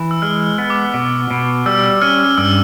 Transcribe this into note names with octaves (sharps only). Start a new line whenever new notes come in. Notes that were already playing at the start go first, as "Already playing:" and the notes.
Already playing: E3
E6
G#3 F6
B3
D6
B2
B2
G3 E6
C#4 F6
G2 E6